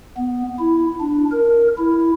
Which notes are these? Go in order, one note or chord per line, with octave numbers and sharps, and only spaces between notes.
B3
E4
D4
A#4
E4